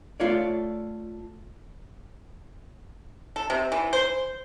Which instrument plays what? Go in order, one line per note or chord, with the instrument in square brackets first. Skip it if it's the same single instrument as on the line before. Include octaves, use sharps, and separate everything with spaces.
[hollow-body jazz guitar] A3 F4 C#5 D5
[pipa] A4
C3
E3
C5